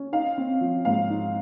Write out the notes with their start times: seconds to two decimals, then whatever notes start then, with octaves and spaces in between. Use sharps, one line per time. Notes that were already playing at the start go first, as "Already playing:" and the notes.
Already playing: C#4
0.13 D#4 F5
0.38 C4
0.61 F3
0.85 G#2 F5
1.10 D#4